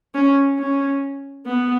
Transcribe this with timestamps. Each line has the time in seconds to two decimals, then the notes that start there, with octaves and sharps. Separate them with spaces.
0.14 C#4
0.58 C#4
1.46 B3